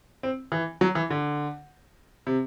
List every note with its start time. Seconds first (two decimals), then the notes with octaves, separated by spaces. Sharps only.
0.23 C4
0.52 E3
0.81 F#3
0.95 E3
1.10 D3
2.27 C3